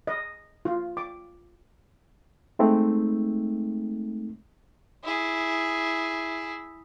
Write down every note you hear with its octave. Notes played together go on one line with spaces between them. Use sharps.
D#5
F4
D6
G#3 A3 C4 D#4
E4 G#4